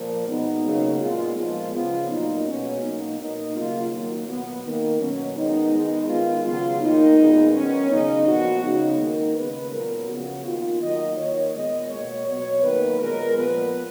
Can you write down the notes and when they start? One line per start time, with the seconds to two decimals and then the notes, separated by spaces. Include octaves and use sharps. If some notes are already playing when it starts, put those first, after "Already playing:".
Already playing: A#2 F3 A#3
0.27 B2 G#3 B3 D#4
0.64 C#3 F#3 A#3
1.00 A#2 G#3 B3 F4
1.36 A#2 F3 G#3 F4
1.72 C#3 F3 B3 F4
2.09 A#2 F#3 A#3 D#4
2.45 B2 G#3 B3 C#4
2.81 B2 F#3 A#3 D#4
3.18 B2 A#3 D#4
3.54 C#3 F#3 A#3 F4
3.91 D#3 F#3 A#3
4.27 B2 F#3 B3
4.63 D#3 A#3
4.99 B2 F#3 B3 C#4
5.36 D#3 G#3 B3 D#4
5.72 D#3 G#3 B3 D#4
6.08 D#3 G#3 B3 F4
6.45 C#3 F#3 B3 F4
6.81 D#3 A#3 D#4
7.17 A#2 G#3 B3
7.54 D#3 F#3 B3 C#4
7.90 C#3 F#3 B3 D#4
8.26 A#2 F3 B3 F#4
8.63 C#3 G#3 B3 D#4
8.99 D#3 A#3 D#4
9.35 C#3 G#3 B3 B4
9.72 A#2 F#3 B3 A#4
10.08 C#3 F3 B3 F#4
10.44 D#3 A#3 F4
10.81 D#3 F#3 A#3 D#5
11.17 D#3 A#3 C#5
11.53 A#2 G#3 B3 D#5
11.90 B2 A#3 C#5
12.26 B2 F#3 B3 C#5
12.62 D#3 F#3 A#3 B4
12.99 A#2 G#3 B3 A#4
13.35 A#2 F3 B3 B4